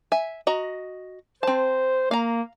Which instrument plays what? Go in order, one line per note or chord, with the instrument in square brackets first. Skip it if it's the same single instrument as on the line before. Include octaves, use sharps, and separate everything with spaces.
[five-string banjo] E5 G#5
F#4 D#5 A#5
[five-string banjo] C4 A5 [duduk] C5
[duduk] A#3 [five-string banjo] F5 A#5